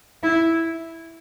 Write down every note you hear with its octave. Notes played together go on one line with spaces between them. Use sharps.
E4